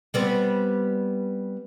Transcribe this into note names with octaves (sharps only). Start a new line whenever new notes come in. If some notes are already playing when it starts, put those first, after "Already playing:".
G3 B3 C4